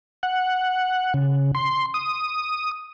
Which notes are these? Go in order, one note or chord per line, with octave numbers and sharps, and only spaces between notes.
F#5
C#3
C6
D#6